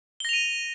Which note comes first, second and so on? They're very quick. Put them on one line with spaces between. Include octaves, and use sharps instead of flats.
G7 A#6 F7 D#7